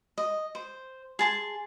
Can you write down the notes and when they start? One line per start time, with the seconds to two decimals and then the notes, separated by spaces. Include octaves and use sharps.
0.18 D#5
0.55 C5
1.19 G#4 A5 C6